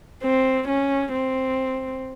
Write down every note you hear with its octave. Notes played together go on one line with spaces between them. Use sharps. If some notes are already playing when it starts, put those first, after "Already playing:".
C4
C#4
C4